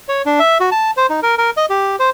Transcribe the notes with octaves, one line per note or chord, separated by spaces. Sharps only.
C#5
D4
E5
F#4
A5
C5
D#4
A#4
A#4
D#5
G4
C5